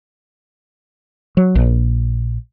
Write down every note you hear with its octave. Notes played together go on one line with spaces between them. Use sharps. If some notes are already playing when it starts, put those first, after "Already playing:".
F#3
A#1